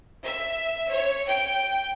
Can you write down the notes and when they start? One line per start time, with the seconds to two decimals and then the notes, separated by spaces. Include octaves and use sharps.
0.25 E5
0.92 C#5
1.28 G5